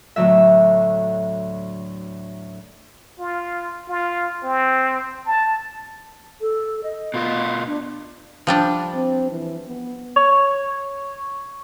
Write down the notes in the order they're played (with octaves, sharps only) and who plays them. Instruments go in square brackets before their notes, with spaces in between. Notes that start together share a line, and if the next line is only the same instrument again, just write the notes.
[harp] D2 A2 D3 F#3 E5
[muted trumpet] F4
F4
C4
A5
[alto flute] A4
D#5
[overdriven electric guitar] B2 F4
[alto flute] D4
[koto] F3 G3 D4
[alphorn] C4
E3
B3
[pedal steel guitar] C#5